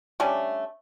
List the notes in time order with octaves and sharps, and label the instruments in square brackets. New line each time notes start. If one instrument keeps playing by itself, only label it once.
[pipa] G3 A3 C#4 D4